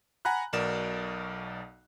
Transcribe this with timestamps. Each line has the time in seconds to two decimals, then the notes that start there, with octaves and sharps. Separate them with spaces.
0.25 F#5 G#5 A#5 B5 F#6
0.53 B1 B2 A#4 D5 E7